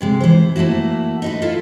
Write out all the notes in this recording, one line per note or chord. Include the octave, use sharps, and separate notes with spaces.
D2 C3 G#3
E3 C5
E3 A3 A#3 E4 F#4
D#4 F#4 B4
E4 F4 A4